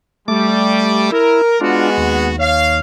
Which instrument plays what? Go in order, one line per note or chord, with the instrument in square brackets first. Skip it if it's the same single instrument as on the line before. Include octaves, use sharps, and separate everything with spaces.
[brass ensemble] G3 [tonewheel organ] A3 D6
[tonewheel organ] E4 [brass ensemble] A#4
[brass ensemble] G#3 B3 F#4 [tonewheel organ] D4 F4
[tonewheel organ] D#2
[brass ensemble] C#5 F5